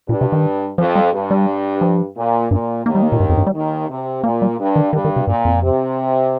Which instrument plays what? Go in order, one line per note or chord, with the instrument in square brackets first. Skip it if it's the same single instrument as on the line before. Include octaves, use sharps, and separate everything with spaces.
[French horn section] G2 [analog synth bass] A#2
[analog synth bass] C3
D#3
[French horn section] F2 [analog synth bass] F3
[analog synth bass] G3
[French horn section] G2
[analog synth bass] G3
F3
[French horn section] A#2
[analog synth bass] G2 [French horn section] A#2
[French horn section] D#2 D#3 [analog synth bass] A#3
[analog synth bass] G3
A#3
A#2
G2
F2
G2
G3
[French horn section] D#2 D#3
C3
[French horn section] A#2 [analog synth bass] A#3
[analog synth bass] G3
[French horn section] G2
[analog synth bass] D#3
[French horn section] G2 [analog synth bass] D#3
[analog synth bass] D#3
C3
[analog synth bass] G2 [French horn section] A#2
[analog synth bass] F2
[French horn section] C3